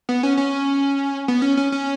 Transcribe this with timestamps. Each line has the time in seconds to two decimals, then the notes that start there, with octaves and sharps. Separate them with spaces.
0.09 B3
0.23 C#4
0.37 C#4
1.28 B3
1.42 C#4
1.57 C#4
1.72 C#4